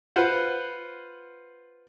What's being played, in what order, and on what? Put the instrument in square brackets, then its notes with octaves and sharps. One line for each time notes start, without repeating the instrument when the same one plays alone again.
[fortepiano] F4 B4 C5 F#5